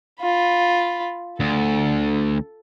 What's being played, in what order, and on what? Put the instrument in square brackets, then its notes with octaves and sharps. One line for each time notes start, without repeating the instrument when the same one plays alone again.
[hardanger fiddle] F4 B5
[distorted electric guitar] D2 [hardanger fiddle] A4